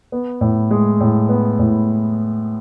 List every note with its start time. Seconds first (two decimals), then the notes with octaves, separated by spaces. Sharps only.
0.12 B3
0.41 A2
0.71 G#3
1.00 A2
1.29 B3
1.59 A2